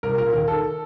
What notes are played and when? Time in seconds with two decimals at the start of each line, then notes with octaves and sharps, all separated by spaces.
0.03 C2 A#4
0.18 A#2 A#4
0.33 D#2 A#4
0.48 D#3 A4